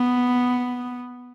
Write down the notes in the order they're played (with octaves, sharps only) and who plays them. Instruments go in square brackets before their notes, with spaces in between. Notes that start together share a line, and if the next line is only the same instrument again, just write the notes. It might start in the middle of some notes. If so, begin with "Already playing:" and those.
Already playing: [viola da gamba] B3